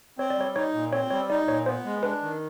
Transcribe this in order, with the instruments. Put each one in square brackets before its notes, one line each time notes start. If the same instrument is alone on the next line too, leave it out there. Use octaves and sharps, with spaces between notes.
[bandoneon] C4 [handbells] C#5
[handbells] D5
[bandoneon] G3 [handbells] C#5
[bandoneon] D#4 [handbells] C#5
[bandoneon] A#2
[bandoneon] C4 [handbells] C#5
[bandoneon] G3 [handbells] C#5
[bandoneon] D#4 [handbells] D5
[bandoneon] A#2 [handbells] C#5
[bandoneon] B3 [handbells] C5
[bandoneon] G#3
[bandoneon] D4 [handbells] B4
[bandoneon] D#3